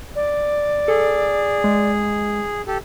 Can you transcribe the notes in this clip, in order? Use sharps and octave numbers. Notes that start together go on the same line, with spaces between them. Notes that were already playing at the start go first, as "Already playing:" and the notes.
D5
G#4 A4
G#3
G4 A4